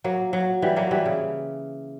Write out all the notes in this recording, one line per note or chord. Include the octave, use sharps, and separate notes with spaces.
F#3 A#3
F#3
E3 G3
F#3 A#3
E3 G3
C#3